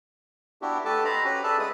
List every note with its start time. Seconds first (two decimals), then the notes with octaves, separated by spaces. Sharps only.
0.62 B3 D4 E4 F#4 G4
0.85 A3 G4 A4 B4 A5 D6
1.05 C5 D#5 A#5 B5
1.24 C#4 F#4 G4 B4
1.43 G#4 A4 B4 D5 E5 A5
1.59 G#3 G#4 B4 D#6